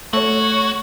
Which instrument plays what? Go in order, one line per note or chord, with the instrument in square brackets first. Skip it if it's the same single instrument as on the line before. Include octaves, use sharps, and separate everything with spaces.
[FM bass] A3 [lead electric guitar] F#4 [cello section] C#5